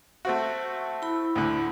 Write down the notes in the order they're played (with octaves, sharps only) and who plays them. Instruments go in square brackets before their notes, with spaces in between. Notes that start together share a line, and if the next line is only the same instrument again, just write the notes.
[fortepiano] A3 C4 F#4
[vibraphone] E4 B5
[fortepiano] D2 A2 D3